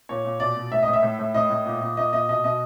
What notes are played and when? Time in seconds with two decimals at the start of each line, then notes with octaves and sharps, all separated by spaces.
0.09 A#2 C#5
0.25 A#2
0.40 B2 D5
0.56 B2
0.72 A2 E5
0.83 D#5
0.88 A2
0.93 E5
1.03 A2
1.19 A2
1.34 A2 D#5
1.50 A2
1.66 A#2
1.81 A#2
1.97 A#2 D#5
2.13 A#2 D#5
2.29 B2 D#5
2.44 B2 D#5